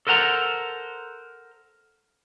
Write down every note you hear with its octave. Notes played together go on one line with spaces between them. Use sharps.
A4 A#4 C5 F#5 A#5